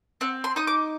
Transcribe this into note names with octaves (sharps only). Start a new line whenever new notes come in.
C4 F#5
C6
D#4 D#6
D6